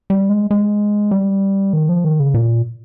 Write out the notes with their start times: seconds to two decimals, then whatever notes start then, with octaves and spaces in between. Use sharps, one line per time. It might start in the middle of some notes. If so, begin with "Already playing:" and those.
0.10 G3
0.29 G#3
0.51 G#3
1.11 G3
1.73 D#3
1.89 F3
2.04 D#3
2.20 C#3
2.34 A#2